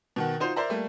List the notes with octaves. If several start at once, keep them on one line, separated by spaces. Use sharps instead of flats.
B2 D#3 F#5
D#4 F4 F#4 C5
A#4 C5 D5 E5 A#5
G3 A3 A#3